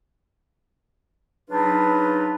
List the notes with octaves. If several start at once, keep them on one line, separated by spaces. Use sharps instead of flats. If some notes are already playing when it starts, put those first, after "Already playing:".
C#3 F#3 D4 D#4 F4 B4